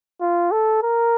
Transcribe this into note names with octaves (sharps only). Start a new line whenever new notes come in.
F4
A4
A#4